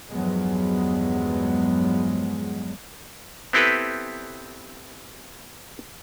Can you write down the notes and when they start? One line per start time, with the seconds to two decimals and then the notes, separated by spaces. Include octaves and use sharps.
0.11 E2 G2 F3 F#3 G#3 B3
3.53 B3 C4 E4 G4 A4 B4